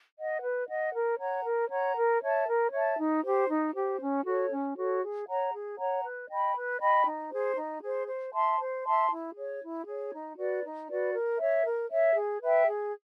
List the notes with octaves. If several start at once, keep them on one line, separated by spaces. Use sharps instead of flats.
D#5 F#5
B4
D#5 F#5
A#4
C#5 F#5 A#5
A#4
C#5 F#5 A#5
A#4
C#5 E5 A5
A#4
C#5 E5 A5
D#4
G4 C5
D#4
G4 C5
C#4
F#4 A4 C#5
C#4
F#4 A4 C#5
G#4
C#5 F#5 A#5
G#4
C#5 F#5 A#5
B4
D#5 G5 B5
B4
D#5 G5 B5
D#4
G#4 C5
D#4
G#4 C5
C5
E5 A5 C6
C5
E5 A5 C6
E4
G#4 C#5
E4
G#4 C#5
D#4
F#4 B4 D5
D#4
F#4 B4 D5
A#4
C#5 E5
A#4
C#5 E5
G#4
B4 E5 G5
G#4